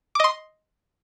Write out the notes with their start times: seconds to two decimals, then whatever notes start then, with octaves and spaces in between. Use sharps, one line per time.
0.15 D6
0.20 D#5
0.24 C6